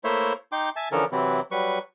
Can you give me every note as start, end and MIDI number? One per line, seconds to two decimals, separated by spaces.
0.04 0.33 57
0.04 0.33 58
0.04 0.33 64
0.04 0.33 72
0.04 0.33 73
0.04 0.33 76
0.52 0.69 63
0.52 0.69 79
0.52 0.69 84
0.52 0.69 86
0.76 0.89 76
0.76 0.89 80
0.76 0.89 81
0.92 1.05 50
0.92 1.05 52
0.92 1.05 53
0.92 1.05 61
0.92 1.05 69
0.92 1.05 70
1.12 1.40 48
1.12 1.40 52
1.12 1.40 54
1.12 1.40 60
1.12 1.40 64
1.51 1.79 54
1.51 1.79 55
1.51 1.79 71
1.51 1.79 85